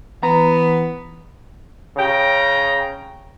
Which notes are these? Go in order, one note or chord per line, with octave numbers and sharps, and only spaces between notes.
E3 B3 A#5
C#3 G5 A#5